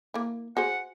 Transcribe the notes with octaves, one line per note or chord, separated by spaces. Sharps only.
A#3 E4
F#4 G#4 C5 F#5